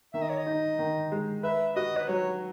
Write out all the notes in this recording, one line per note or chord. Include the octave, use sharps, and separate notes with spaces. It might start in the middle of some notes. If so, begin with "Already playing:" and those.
D#3 E5
D#5
C#5
D#5
D#4
D#3
G#3
B4 E5
F#4 D#5
B4
F#3 C#5